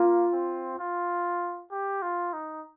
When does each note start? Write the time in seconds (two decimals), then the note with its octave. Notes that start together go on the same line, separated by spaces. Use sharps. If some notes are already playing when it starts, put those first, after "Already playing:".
Already playing: A#3 F4
0.33 C4
0.79 F4
1.71 G4
2.02 F4
2.33 D#4